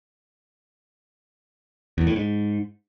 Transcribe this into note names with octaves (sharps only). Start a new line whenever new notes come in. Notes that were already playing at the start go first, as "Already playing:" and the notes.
E2
A2
G#2